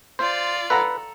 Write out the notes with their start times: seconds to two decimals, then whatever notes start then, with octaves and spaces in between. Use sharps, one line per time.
0.19 F4 C5 D5 A6
0.70 A4 B4 F#5 A#5